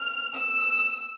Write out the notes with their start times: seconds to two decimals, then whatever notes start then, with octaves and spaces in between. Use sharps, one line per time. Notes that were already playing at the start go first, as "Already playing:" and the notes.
Already playing: F6
0.35 E6